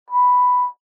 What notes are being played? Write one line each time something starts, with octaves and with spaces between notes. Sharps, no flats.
B5